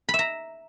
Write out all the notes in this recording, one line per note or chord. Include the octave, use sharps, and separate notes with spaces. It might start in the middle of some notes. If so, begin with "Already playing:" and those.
B5
E5
A#5